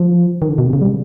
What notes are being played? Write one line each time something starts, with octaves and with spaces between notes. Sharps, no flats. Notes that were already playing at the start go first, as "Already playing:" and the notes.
Already playing: F3
D#3
D3
B2
C3
C#3
G3